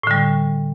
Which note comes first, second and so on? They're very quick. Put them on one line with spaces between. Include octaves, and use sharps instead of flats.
A2 D3 G3